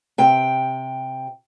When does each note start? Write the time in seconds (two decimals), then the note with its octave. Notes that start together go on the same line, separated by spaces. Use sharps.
0.18 C3 G5